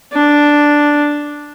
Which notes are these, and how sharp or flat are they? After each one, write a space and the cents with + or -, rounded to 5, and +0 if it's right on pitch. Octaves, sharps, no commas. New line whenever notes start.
D4 +0